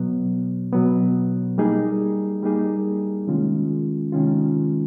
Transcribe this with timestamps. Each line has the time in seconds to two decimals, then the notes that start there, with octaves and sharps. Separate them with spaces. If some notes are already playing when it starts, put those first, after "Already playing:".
Already playing: B2 F#3 B3
0.72 B2 F#3 B3
1.58 G3 A#3 D#4 G#4
2.43 G3 A#3 D#4 G#4
3.27 C3 D#3 G#3 C#4 F4
4.12 C3 D#3 G#3 C#4 F4